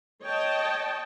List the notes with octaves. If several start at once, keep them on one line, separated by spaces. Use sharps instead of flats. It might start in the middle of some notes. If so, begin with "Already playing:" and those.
C#5 D#5 G5 A5